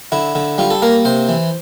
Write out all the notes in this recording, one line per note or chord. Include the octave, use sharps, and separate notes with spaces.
D3 E4
D3
G3 F4
A4
A#3 A#4
C3 C5
E3